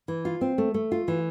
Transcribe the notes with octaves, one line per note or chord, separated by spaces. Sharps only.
E3
F4
C4
A3
A3
F4
E3